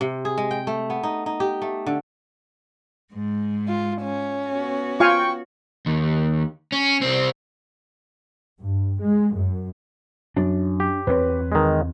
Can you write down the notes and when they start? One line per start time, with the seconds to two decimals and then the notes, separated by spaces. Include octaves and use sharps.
0.01 C3
0.25 G#4
0.38 G#3
0.51 G5
0.67 A3
0.90 B3
1.03 D#4
1.26 D#4
1.40 G4
1.62 A3
1.86 D3
3.13 G#2 G#3
3.68 F4
4.02 C#4
4.50 B3 F#4
5.00 F4 F5 G5 G#5 C#6
5.86 D#2
6.72 C#4
7.02 C2 C4
8.60 G2
9.01 G#3
9.35 F#2
10.36 F#2 D4
10.80 G4
11.07 E2 C4 B4 C#5
11.52 D#3 G#3